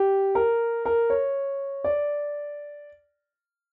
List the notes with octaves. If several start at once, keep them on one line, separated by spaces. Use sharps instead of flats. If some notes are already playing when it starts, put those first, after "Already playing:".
Already playing: G4
A#4
A#4
C#5
D5